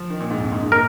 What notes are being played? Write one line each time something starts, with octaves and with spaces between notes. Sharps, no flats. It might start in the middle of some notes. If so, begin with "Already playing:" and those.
Already playing: F3
D#3
A#2
G#2
F2
G#2
G#2
A#2 A#4